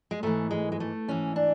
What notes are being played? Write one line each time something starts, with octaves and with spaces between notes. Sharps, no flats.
G#3
G#2 E3 A3
G#3
G#3
A3
G#2 E3 C#4
D4